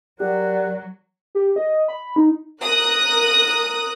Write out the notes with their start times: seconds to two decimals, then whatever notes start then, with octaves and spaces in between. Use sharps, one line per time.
0.20 F#3 G4 A#4 D5 F#5 F#6
1.35 G4
1.56 D#5
1.88 B5
2.16 D#4
2.62 A#4 D#6 F#6